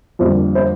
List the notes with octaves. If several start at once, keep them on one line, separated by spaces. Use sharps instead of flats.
F2 D3 G3 A#3 C5
C5